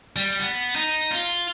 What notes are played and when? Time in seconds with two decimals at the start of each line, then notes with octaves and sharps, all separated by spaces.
0.16 G3
0.40 B3
0.76 D#4
1.11 F4